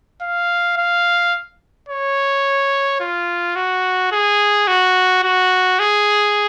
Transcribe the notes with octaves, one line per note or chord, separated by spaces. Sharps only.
F5
F5
C#5
F4
F#4
G#4
F#4
F#4
G#4